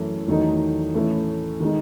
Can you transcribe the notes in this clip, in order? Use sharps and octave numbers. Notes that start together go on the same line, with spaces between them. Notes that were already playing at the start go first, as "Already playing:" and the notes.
Already playing: F#2 E3 A3 E4
E2 D#3 F#3 A3 D#4
A2 E3 A3 C#4 E4
D#3 G#3 D#4